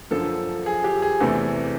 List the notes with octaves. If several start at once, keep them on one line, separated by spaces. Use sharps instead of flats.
F#2 D3 F3 A4
G#4
G4
G#4
E2 C3 E3 A3